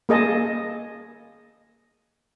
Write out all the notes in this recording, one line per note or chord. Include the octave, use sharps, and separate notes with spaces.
A#3 G#4 D#5 A5